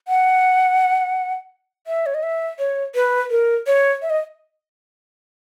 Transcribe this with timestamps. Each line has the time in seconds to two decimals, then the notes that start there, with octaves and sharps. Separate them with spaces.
0.08 F#5
1.87 E5
2.06 C#5
2.15 D#5
2.23 E5
2.59 C#5
2.95 B4
3.30 A#4
3.67 C#5
4.02 E5
4.10 D#5